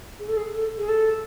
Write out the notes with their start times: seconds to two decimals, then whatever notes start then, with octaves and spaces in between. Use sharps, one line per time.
0.19 G#4
0.28 A4
0.37 G#4
0.54 A4
0.78 G#4
0.89 A4